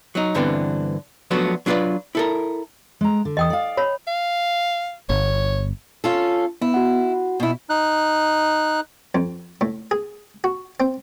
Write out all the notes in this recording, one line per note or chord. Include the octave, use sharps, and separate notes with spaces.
F#3 D#4
G2 D3 E3 B3 C4 D4
F3 F#3 A3 B3 D4 F#4
F#3 D4 F4 G#4 B4 D5
E4 A4 A#4
G#3 A#5
D3
E2 D#5 G5 D#6
D5 F5
C#5 B5
F5
G1 C#5
C#4 F4 A4
B3 E4
F#4 F#5
B2 E4
D#4 F#6
F2
A2
G#4
F#4
C4